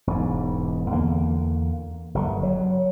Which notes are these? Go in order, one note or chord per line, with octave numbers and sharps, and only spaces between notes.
E1 G#2
E2 D3 A#3
F#1 G2 D3
F#3